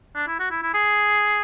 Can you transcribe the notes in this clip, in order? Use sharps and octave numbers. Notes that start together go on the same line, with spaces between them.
D4
E4
F#4
E4
E4
G#4